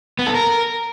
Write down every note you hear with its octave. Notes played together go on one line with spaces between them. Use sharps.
B3
A4
A#4